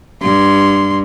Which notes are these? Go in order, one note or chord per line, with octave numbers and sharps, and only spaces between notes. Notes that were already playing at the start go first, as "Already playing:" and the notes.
G2 C6